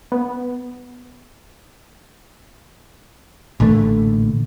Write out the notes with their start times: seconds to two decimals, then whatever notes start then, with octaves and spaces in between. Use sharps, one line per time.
0.12 B3
3.60 A1 A#2 D3 A3